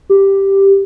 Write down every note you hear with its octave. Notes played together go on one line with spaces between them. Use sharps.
G4